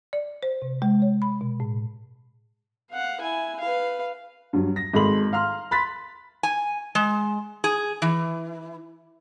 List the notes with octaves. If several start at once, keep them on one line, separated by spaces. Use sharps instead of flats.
D5
C5
C3
G#3
C#5
B5
B2
A2
F5 F#5
E4 G#5
B4 F5
G2 F#3
A#6
G#1 G#3 A4 B5 C6 F#7
F5 A#5 C6 F6
B5 C6 F#6 A6 B6
G#5
G#3
G#4
E3